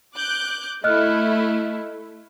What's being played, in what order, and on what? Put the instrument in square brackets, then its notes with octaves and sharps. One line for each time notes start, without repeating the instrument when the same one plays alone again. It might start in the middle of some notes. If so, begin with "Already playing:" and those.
[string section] D6 F#6 G6
[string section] A3 E4 [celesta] D#5 F6 F#6